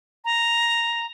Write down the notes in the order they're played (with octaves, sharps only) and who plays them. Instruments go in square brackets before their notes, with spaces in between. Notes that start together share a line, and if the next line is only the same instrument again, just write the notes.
[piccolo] A#5